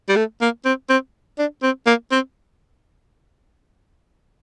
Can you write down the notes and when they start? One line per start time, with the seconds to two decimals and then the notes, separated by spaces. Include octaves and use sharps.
0.08 G3
0.16 A3
0.42 A#3
0.65 C4
0.89 C4
1.38 D4
1.63 C4
1.87 A#3
2.12 C4